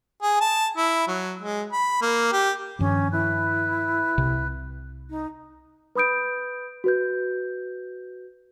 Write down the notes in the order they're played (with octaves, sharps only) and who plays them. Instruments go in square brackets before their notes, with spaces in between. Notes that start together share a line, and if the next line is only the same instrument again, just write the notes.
[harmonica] G#4
A5
E4
F#3
G#3
B5
A#3
G4
[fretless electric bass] G2 D#3 F3 [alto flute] C#4
[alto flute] E4 [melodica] B4
[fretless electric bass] C2 C3
[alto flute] D#4
[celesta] B4 B5 D#6 G6 D7
F#4 B4 G6